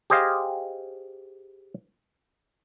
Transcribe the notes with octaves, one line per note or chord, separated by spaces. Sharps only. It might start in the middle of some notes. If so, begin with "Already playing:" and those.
G4 G#4 C5 D#5 F5